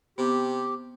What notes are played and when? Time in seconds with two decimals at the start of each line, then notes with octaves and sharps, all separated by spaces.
0.18 C3 B3 G4